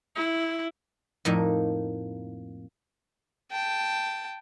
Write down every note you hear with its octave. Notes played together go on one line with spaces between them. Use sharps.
E4
F2 A2 A#3 D#4
G5 A5